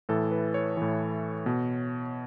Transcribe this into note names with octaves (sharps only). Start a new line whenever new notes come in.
A2 E3 A4
B4
C#5
A2 E3
B2